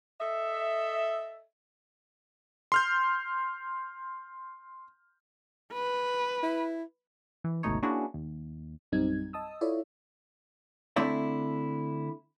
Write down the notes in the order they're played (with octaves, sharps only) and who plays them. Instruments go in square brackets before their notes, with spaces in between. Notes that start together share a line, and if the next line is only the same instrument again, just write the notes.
[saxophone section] A4 D#5 E5
[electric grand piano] C6 F6 G6
[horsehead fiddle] B4
[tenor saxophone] E4
[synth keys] E3
G1 C#2 B2 A3 D#4 C#5
A#3 C#4 D4 E4 F#4 G#4
D#2
[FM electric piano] A#1 F#2 G3 C4 D#4 G#6
D#5 A5 D#6 E6
E4 F4 A4 C#5 D5 E5
[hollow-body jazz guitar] D3 A3 C4 E4 D5 E5